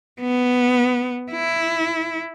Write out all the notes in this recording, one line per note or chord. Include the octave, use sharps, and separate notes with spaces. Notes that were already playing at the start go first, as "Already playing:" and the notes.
B3
E4